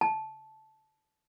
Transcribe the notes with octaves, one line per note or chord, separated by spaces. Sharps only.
A5